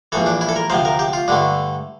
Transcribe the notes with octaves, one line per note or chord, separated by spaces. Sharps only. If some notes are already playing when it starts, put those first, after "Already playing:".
A#1 A2 E3 A4
D4
E4
A4
A#4
D2 C3 F3 C5
A#4
G4
F4
G2 D3 A3 D4